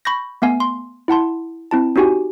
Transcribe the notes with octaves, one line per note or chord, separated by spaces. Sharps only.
B5 C#6 G6 A#6
A3 B3 F5 G#5
C6
E4 F#5 A5 C6
C4 E4 A5
C#4 D#4 F#4 G4 G#5